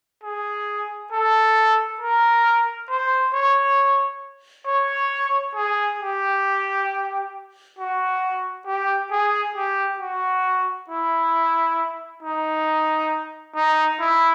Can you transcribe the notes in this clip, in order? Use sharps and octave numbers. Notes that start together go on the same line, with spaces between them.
G#4
A4
A#4
C5
C#5
C#5
G#4
G4
F#4
G4
G#4
G4
F#4
E4
D#4
D#4
E4